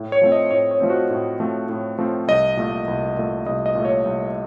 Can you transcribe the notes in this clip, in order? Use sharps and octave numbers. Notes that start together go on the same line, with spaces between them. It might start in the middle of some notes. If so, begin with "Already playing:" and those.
Already playing: A2
C#5
F3 A3 C4
D#5
A2 C#5
C#5
F3 A3 C4
F#4
A2
F3 A3 C4
A2
F3 A3 C4
C2 D#5
A#2 A3
C2
A#2 A3
C2 D#5
D#5
A#2 A3
C#5
C2